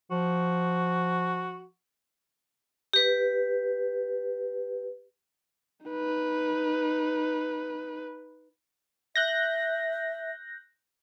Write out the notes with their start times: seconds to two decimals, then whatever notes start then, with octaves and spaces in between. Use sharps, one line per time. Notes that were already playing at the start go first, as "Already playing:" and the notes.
0.11 F3 F#4
2.93 G4 B4
5.86 D#4 B4
9.16 E5 F#6 G6 A#6